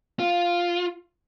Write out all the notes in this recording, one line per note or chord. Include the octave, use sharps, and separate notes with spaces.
F4